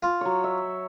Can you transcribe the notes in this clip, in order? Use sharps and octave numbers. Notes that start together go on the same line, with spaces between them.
F4
F#3 C#5
E5